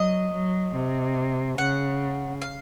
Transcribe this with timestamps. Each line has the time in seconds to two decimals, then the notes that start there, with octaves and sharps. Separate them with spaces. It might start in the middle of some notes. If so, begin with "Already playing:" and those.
Already playing: F#3 D#5
0.33 F#3
0.75 C3
1.58 C#3 F#5
2.42 F5